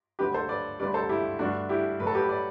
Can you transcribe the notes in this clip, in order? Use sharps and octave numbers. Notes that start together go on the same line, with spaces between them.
D2 D3 F#3 G4 B4
A4 C5
B4 D5
D2 D3 G3 B4 D5
A4 C5
E4 G4
G2 D3 A3 D4 F#4
E4 G4
A2 F#3 A3 B4
A4
G4 B4
B4 D5